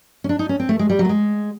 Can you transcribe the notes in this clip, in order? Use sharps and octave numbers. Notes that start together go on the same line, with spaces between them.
C#4
D4
D#4
C#4
C4
A3
G#3
G3
F#3
A3
G#3